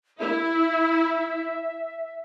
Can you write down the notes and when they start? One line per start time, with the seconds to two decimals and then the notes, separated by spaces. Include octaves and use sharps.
0.19 E4 E5